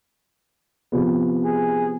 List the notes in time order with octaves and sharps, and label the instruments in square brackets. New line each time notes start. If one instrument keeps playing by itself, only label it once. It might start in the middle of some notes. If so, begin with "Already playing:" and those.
[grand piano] C3 F3 B3
[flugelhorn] G#4